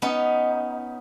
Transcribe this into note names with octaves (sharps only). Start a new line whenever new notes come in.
B3 C#4 D#4